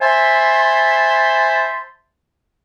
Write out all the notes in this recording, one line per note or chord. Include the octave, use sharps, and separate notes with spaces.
C5 E5 G#5 A5 B5 C6